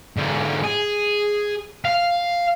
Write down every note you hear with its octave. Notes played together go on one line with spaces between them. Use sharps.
G#2 D3
G#4
F5